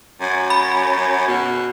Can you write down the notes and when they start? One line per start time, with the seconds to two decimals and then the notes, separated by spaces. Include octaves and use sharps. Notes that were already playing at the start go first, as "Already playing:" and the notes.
0.21 F#2
0.50 B5
1.28 B2